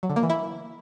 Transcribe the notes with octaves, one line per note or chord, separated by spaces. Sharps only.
F#3
D3
A#3
E3
E4